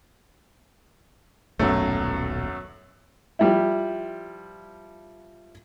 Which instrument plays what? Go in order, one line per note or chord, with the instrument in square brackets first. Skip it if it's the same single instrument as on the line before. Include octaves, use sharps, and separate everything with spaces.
[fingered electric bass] D#1 B1 B3 [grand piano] F#2 F#3 A3
[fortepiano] F3 G3 E4